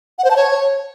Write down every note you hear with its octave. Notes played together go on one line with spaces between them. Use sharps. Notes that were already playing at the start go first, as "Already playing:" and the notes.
F#5
C5
A5
C#5